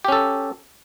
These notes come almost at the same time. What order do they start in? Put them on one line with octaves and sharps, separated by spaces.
G4 C#4 A4